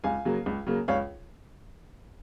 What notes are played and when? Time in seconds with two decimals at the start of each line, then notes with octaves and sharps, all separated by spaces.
0.04 C#2 F5 G#5
0.25 C#3 F#3 A#3
0.46 C#2
0.67 C#3 F#3 A#3
0.88 C#2 C#5 F5